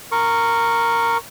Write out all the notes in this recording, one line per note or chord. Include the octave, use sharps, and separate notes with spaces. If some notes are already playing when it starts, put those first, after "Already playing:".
A#4 C#6